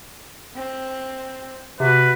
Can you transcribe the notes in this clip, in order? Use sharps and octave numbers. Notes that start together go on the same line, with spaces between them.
C4
C3 F#4 B4